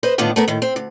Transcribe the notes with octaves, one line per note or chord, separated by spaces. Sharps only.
B4 C5 D#5
A2 D3 D#3 B3 D4 F4
A3 B3 A#4
A2 D#3
C4
D2